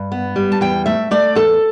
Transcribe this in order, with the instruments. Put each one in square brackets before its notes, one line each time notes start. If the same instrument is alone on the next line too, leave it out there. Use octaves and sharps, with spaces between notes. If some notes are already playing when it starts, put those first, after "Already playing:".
Already playing: [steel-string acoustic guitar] G2
B3
G3
A5
E2 G5
A3 E5
A3 D5
E2 A4